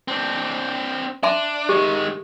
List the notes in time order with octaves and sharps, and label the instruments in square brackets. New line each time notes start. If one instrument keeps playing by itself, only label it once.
[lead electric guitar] C4 D4
[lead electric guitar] D4 [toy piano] E5 A5 C6
[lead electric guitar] D#3 G#3 [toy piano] G4